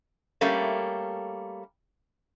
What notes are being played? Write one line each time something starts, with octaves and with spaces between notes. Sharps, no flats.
G3 A3 A#3 C#4